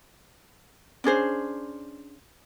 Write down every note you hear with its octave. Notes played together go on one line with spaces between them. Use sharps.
C#4 D4 G#4 C5